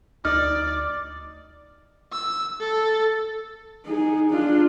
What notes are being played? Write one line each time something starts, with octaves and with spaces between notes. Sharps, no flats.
D2 D#4 D5 F6
E6
A4
D#4 G#4
D4 F4